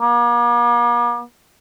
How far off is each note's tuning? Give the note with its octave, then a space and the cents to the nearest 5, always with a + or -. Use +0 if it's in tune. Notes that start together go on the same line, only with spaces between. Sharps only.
A#3 +45